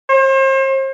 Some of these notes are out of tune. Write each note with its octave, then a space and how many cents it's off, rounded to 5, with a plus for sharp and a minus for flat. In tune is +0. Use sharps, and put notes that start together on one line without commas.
C5 +40